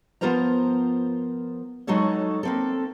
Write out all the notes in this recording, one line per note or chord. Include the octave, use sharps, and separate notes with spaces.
F3 B3 F4 A#4 C5 A#5
F#3 G#3 D#4 F#4 A4 C#5
A#3 C4 A4